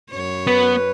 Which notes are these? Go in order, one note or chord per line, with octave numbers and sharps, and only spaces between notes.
F#2 C#5
B3 B4